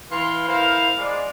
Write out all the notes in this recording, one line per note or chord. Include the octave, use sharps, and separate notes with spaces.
E3 F5 C6
E4 A#4 C5 F5
G#3 D5